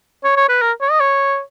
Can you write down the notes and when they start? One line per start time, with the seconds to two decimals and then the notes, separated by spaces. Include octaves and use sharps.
0.24 C#5
0.36 C#5
0.49 B4
0.62 A#4
0.81 C#5
0.91 D#5
1.00 C#5